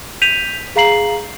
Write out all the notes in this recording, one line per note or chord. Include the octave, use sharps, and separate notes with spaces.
G6 B6 D#7 F7
G#4 F5 A#5 C7 F#7